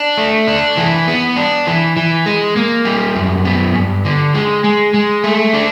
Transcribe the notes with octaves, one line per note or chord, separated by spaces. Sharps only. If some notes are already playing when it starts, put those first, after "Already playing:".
Already playing: D4
A3
D4
E3
B3
D4
E3
E3
G#3
A#3
G3
F#2
B3
G2
D3
G#3
G#3
G#3
A3
D4